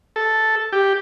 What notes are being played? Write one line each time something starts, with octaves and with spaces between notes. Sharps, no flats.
A4
G4